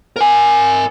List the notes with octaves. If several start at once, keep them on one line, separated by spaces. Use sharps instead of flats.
A#4 G#5